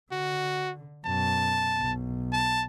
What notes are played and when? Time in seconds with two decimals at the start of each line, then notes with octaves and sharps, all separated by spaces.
0.12 D3 F#4
1.05 F#2 B2 A5
1.79 B1
2.33 A5